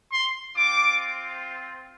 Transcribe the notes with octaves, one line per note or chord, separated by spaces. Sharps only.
C6
C4 F4 D6